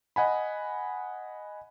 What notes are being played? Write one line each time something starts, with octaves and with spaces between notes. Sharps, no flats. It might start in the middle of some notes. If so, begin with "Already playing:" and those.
D#5 F#5 G#5 B5